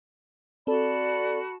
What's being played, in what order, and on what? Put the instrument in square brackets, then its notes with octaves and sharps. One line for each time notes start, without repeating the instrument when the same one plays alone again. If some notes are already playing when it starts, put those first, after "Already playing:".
[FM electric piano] C4 A4 [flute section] F#4 A5 B5 [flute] D5